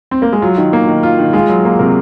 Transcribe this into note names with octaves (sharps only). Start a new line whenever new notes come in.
C4
A#3
G#3
F#3 F4
D#3
A#3
D#3
F4
D#3
G#3 F4
F#3
A#3
C3 A#4